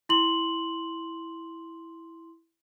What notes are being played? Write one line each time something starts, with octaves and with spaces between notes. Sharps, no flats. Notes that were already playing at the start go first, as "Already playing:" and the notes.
E4 C6 F#7